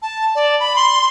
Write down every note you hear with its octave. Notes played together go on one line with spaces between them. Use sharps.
A5
D5
B5
C6